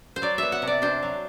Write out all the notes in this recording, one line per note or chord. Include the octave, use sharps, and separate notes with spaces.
C5
F#3 D5
B3 E5
F#5
C3
D5
D4 C5
F#3